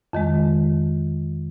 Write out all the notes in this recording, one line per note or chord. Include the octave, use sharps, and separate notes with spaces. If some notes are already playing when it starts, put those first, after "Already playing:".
F2 D#3 G#3